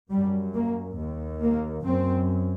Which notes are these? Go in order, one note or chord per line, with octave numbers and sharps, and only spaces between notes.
F#2 G3
A#3
D#2
A#3
F#2 C4